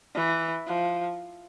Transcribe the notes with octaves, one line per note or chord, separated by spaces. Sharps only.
E3
F3